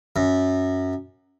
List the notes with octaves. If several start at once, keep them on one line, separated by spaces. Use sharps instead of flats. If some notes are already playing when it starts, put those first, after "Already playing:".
F#2